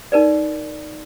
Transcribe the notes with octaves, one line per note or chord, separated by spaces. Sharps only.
D#4 A#4 B4 D5